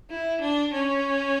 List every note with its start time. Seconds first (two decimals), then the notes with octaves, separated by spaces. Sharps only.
0.10 E4
0.40 D4
0.72 C#4